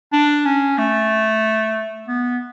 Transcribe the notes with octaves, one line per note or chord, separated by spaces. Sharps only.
D4
C#4
A3
B3